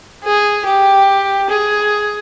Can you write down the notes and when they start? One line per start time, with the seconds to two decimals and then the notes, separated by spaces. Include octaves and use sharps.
0.24 G#4
0.65 G4
1.50 G#4